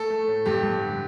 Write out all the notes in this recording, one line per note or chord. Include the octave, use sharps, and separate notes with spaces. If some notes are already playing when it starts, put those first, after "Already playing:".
Already playing: A3 A4
A3
A2
G2 G4
G2
D3